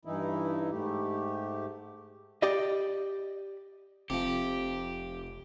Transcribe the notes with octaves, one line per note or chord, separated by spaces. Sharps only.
G2 E3 D#4 E4
G#2 A3 G4
G4 D5 D#5
F1 F2 C3 F3 G4